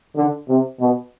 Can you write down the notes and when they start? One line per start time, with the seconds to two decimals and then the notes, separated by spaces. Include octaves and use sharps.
0.16 D3
0.48 C3
0.79 B2